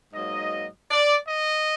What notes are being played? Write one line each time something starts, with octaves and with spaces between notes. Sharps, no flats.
G#2 F#3 A#3 D#5
D5
D#5